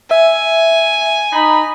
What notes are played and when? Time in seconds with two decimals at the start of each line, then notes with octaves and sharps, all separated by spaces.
0.11 E5 G#5
1.33 D#4 B5